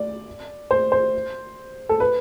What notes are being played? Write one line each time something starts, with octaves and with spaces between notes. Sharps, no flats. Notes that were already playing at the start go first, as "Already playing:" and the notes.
Already playing: D5
C5
C5
A4
B4